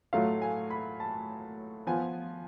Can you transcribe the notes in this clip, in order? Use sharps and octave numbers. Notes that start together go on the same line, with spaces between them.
A2 F#3 A3 F4 F5
G#5
B5
A5
F3 B3 F4 G#5